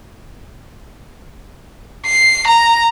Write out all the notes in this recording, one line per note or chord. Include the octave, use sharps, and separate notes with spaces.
C7
A#5